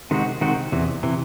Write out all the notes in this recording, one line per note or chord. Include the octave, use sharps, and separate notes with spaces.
C3 D#3 G#3 C4 F#4
C3 D#3 G#3 C4 F#4
E2 C3 E3
C3 E3